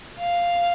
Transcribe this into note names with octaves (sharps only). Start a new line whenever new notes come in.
F5